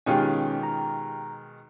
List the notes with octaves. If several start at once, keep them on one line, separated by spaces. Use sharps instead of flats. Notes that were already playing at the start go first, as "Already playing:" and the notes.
B2 D#3 G#3 C#4 F4 G4 G#5
A#5